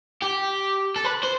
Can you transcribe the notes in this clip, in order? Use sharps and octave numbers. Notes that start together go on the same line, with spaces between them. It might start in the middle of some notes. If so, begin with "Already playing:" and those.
G4
A4
B4
C5